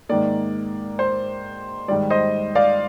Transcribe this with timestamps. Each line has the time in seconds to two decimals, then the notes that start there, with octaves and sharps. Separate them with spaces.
0.09 G#2 D#3 A#3 D5
0.99 C5
1.88 G#2 D#3 G3 D5
2.10 C5 D#5
2.55 D5 F5